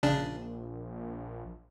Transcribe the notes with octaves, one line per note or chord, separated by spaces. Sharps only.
A#1 C#3 D4